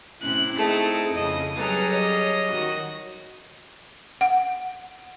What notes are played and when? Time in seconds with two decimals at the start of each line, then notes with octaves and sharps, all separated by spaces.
0.21 A2 C3 C#4 E4 F#6
0.56 A3 C4 D#4 G#4 A5
1.15 F2 C#3 D#5
1.57 F#3 G3 C#4 G#4 A4 B4 A#5
1.91 C#5 D#5
2.52 D#3 F#4
4.21 F#5